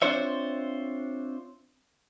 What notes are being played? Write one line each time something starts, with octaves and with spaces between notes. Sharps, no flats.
C4 D4 F4 C5 C#5 E5